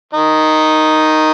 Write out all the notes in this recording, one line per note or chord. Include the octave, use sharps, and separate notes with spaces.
D#3 D#4